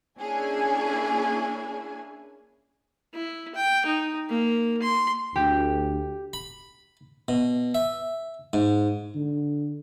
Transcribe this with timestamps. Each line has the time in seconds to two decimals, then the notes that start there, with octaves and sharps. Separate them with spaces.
0.19 A#3 C#4 D4 E4 G#4 G#5
3.14 E4
3.55 G5
3.86 D#4
4.30 A#3
4.82 C6
5.36 D2 G4
6.33 B5
7.28 B2
7.75 E5
8.53 G#2
9.15 D3